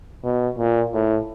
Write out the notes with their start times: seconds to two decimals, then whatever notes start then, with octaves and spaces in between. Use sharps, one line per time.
0.24 B2
0.58 A#2
0.94 A2